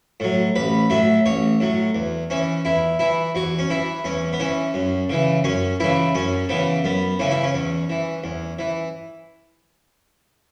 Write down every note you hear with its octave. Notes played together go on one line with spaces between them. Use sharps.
A2 F#3
A1 B4
A2 F#3 E5
A1 C#5
A2 F#3
E2
E3 C#4
E2 E4
E3 E4
E2 F#4
C#4
E3 E4
E2 C#4
B3
E3 C#4
F#2
C#3 E3
F#2 C#4
C#3 E3 E4
F#2 C#4
C#3 E3 B3
F#2 B3
C#3 E3 C#4
E4
C#4
E2
E3
E2
E3